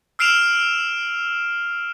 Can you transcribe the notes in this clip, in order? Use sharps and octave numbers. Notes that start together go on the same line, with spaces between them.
E6 F6 C7 D7 E7 F7